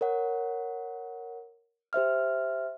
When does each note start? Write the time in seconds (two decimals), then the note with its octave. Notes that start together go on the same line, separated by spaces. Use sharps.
0.01 A#4 C#5 F#5
1.93 G4 C5 E5 F6